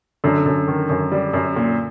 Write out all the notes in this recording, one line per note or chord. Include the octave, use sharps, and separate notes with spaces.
F#2 D3
F#2
D#3
F#2
G3
F#2
A#2